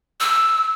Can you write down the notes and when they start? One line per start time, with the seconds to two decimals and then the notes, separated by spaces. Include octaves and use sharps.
0.21 E6